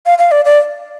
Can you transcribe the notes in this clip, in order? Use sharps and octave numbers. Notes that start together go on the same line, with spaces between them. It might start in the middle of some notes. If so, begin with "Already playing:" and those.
F5
F5
D5
D5